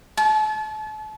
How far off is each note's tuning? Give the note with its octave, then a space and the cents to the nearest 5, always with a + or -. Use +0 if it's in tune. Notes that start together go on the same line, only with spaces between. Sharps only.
A5 -35